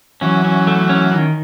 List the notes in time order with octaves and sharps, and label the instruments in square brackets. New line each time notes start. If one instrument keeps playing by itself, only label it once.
[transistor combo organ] E3 F#3 [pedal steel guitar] C#4
[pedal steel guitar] C#4
A3
C#4
D#3